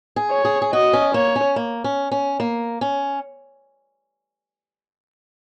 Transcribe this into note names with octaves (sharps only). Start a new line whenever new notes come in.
G#4
C#5
G#4
G#4
F#4 D#5
C#4
A#3 C#5
C#4
A#3
C#4
C#4
A#3
C#4